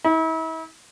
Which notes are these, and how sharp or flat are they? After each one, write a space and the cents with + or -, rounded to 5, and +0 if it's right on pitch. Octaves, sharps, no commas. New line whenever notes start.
E4 -40